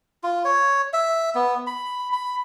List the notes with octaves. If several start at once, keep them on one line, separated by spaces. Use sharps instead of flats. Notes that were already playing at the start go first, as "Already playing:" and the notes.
F4
C#5
E5
B3
B5
B5